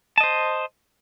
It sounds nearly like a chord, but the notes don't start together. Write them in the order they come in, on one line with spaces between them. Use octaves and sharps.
A5 D#5 C5